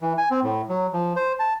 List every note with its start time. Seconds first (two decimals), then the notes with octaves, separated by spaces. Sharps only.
0.01 E3
0.18 G#5
0.31 C4
0.43 A2
0.69 F#3
0.93 F3
1.16 C5
1.39 A5